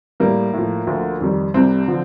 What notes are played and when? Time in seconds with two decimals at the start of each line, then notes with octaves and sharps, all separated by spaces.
0.20 A2 G3 A#3
0.53 A2 F3
0.87 D2 D3 F3
1.21 F2 D#3 G3
1.54 C2 C3 G3 C4
1.88 D3 F3